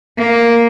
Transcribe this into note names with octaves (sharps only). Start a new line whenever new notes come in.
A#3